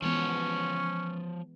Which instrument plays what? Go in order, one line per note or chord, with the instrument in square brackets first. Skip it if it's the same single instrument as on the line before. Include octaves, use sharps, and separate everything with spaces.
[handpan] E3 G#3 B3 [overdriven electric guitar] F3 C#5 [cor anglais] C#4